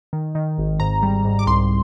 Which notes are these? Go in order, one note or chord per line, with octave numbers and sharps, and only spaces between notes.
D#3
D#3
G#1
G#2 A#5
G3
G#2
D6
C2 C6